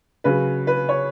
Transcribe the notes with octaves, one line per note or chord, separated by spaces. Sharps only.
C#3 F#3 B4
B4
C#5